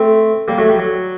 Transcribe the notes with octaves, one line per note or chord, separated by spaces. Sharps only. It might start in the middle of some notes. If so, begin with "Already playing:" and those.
Already playing: A3 C4
G3 A#3
F#3 A3
G3
F#3